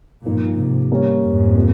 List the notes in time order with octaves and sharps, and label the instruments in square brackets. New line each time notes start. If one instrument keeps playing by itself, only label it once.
[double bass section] G2 A#2 [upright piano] F3 A#3 D#4
[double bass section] G#2 C3
[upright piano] G3 A#3 C#4
[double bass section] F2 G#2
[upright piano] C3 F3 A#3